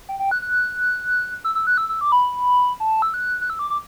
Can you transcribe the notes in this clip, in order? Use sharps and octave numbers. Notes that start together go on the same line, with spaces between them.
G5
G5
F#6
F#6
E6
E6
F#6
E6
E6
D6
B5
A5
E6
F#6
F#6
E6
D6
D6